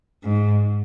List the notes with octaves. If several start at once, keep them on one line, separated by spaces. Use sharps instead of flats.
G#2